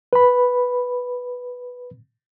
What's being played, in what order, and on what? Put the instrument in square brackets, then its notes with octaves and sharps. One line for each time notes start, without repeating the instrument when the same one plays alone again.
[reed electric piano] B4 B5